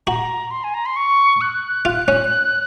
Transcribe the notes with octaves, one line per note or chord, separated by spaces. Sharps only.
F#4 A#5
C6
G#5
A#5
C6
C#6
F#6
F4
C#4